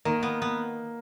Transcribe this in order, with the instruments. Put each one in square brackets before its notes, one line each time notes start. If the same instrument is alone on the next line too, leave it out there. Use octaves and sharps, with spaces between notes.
[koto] D#3 [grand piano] A#3
[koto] B3
B3